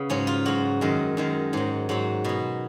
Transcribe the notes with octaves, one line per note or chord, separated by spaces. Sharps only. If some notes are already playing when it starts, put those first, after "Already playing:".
Already playing: C#3 B3
G#2 F#3 C#4
F4
G#2 F#3 F#4
F#2 D#3 G#3
F#2 D#3 G#3
G#2 F#3
G#2 F#3 F#4
B2 F#3